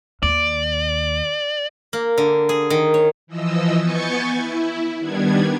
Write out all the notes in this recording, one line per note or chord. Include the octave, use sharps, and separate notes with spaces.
D#2 D5
A#3
D3
G#4
D#3
C#5
E3 F3 D#5 E6
B3 G#5 C#6 G6 A6 C#7
E4
D#3 G3 B3 D4 G#6